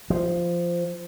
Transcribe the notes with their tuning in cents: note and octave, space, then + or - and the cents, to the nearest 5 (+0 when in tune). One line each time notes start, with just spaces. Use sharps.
F3 -10